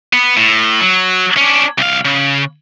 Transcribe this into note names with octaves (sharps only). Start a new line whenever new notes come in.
B3
A2
F#3
C#4 D4
C2 F5
C#3